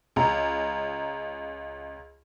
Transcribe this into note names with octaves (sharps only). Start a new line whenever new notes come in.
C#2 A#5